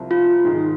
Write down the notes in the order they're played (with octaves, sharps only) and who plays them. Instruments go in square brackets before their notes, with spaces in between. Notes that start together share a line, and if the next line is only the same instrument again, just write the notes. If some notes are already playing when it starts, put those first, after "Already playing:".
Already playing: [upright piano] C2 C3 F3
[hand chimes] F4
[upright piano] G#2 D#3 G#3